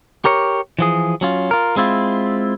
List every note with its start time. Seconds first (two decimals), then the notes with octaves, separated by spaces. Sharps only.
0.25 G4 A#4 C#5
0.79 E3 F3 G#4
1.21 F#3 C#4 F4
1.51 F4 A#4
1.76 G#3 C4 E4 F4